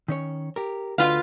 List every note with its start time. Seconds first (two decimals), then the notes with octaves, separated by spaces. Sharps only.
0.08 D#3 C#4 C#5
0.56 G4 A#4
0.98 D2 D3 F4 F#4 B4 F5